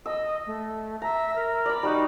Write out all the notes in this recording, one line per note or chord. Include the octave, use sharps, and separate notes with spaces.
D#5 E6
A3
E5 A#5
A#4
D5 B5
G3 D#4 F#4